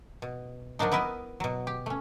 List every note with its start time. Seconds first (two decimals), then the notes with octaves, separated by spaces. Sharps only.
0.22 B2
0.79 F3 F#3 A#3 D4 D#4
0.92 B3 E4 A#4 B4 D#5
1.40 B2 F#3
1.67 G4
1.86 A3 C#4